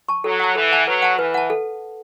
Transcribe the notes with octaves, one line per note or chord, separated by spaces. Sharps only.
A5 C#6
F#3 A4
F#5 A5
E3 A4
F#5 A5
F#3 B4
F#5 A5
E3 B4
F#5 A5
A4